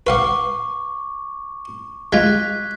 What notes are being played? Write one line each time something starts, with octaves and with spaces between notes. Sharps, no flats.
B4 F5 F#5 C#6 D6
G#3 F4 F#6 G#6 B6